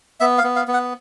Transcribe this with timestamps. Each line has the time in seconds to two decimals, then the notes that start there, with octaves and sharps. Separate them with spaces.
0.20 B3 E5
0.38 F5
0.44 B3
0.56 F5
0.68 B3
0.74 F#5